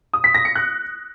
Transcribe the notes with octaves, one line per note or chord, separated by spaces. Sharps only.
D#6
B6
A#6
C#7
F#6